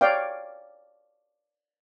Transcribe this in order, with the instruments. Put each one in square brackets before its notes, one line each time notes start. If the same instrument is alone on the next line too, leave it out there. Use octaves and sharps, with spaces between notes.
[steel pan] C#5 D5 F5 G5